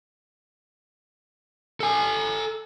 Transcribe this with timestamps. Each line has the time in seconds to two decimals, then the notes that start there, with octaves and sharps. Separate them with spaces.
1.80 A4 G#5